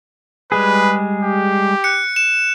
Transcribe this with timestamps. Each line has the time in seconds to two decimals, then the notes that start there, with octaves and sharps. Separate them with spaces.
0.52 G3 G#3 G#4 B4
1.23 G4
1.84 F#6 C#7
2.16 E7